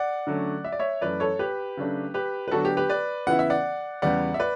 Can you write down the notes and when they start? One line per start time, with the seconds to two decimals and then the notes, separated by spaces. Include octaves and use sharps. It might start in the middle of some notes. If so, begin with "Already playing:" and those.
Already playing: D5 F#5
0.27 D3 F#3 A3 C#4
0.65 E5
0.72 D5
0.79 C#5 E5
1.01 F#2 E3 A3 B4 D5
1.20 A4 C#5
1.39 G4 B4
1.77 C#3 F#3 A3 D4
2.14 G4 B4
2.48 B4
2.51 D3 F#3 B3 D4 F#4 A4
2.65 G4
2.77 G4 B4
2.89 B4 D5
3.27 C#3 E3 B3 E4 F#5
3.39 E5
3.50 D5 F#5
4.02 E2 C#3 G3 B3 D5 F#5
4.34 E5
4.39 B4 D5